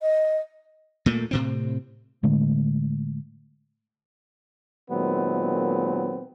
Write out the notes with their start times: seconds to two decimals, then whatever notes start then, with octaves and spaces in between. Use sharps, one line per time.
0.01 D#5
1.06 A#2 A3 A#3
1.31 A2 C3 C4
2.23 A2 D3 G#3 A3
4.90 A#2 D#3 F#3 G#3 B3 C4